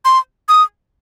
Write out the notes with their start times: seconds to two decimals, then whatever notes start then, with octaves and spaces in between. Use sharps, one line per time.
0.05 C6
0.49 D#6